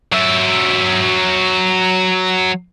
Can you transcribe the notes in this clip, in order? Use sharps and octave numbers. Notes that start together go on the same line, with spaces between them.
F#3 E5